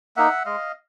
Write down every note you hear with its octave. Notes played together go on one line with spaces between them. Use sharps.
A#3 D#4 E5 F#5
G#3 D#5 F5